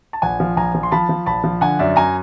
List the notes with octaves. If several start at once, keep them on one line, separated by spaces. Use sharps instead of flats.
A5
A#1 F#5 G#5
F3
A#1 G#5 A#5
F3
C6
F3 A5 B5
F3
A#1 A5 B5
F3
D3 F#5 G#5
F#2 D5 E5
F#2 G#5 A#5